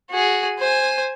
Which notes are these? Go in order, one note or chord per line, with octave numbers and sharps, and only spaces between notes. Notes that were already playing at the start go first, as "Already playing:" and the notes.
F#4 G#4
C5 G#5